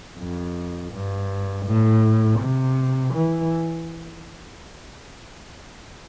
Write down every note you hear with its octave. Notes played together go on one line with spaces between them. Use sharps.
F2
G2
A2
C3
E3